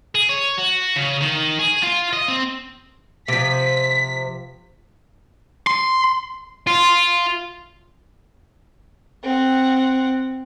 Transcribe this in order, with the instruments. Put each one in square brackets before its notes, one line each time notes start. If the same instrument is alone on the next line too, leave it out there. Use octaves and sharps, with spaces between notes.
[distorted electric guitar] G#4
C#5
F#4
C#3
D#3
G#4
F4
D#5
C4
[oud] C3 F3 [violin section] B6
[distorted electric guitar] C6
F4
[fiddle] C4 F#5